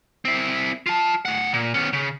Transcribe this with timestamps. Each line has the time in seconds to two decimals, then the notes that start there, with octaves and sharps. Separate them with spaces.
0.25 C4 E4
0.86 F4 A5
1.25 A2 F#5
1.53 A#2
1.74 B3 C#4
1.93 C#3